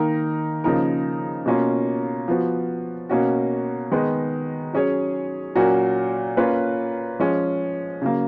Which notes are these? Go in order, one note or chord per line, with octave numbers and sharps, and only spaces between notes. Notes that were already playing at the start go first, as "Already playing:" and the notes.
Already playing: D#3 A#3 D#4 A#4
C#3 F3 A#3 D#4 A#4
B2 A#3 C#4 F4
F3 B3 F#4
B2 A#3 C#4 F#4
D#3 G#3 B3 D#4
F#3 C#4 G#4 C#5
A#2 F#3 C#4 F#4 A#4
A#3 C#4 F4 B4
F3 G#3 C#4
C#3 F#3 A#3